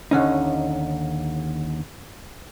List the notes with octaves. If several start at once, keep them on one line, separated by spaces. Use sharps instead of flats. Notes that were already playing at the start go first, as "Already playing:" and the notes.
D#2 D3 C#4 D#4